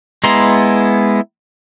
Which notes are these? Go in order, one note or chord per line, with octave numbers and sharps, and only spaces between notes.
G#3 B3 E4 A#5 C6